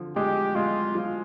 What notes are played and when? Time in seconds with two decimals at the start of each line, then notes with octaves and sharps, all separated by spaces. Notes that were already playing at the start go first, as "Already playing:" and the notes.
Already playing: D3 F3
0.16 G#3 G4
0.55 G#3 F4
0.95 F3